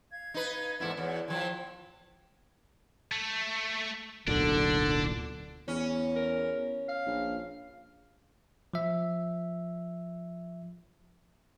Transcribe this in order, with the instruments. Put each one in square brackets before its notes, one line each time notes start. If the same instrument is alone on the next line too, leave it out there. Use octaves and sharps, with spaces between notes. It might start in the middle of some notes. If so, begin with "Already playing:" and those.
[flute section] F5 G#6
[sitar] D#4 B4
[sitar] E2 G#2 E4 [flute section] A4 F#5 G#6
[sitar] E2 [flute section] F#4 C#5 F#5
[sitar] E3 F3 [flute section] G5 C6 G#6
[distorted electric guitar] A3
[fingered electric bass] D1 B1 A#2 [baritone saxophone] D3 [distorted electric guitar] D4
[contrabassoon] E2 [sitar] C#4
[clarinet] A#4
F5
[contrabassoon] A#1
[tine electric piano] F3 E5